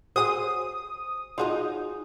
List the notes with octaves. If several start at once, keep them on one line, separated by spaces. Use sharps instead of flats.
F#4 G#4 C5 D#6
D#4 F4 F#4 G#4 D#5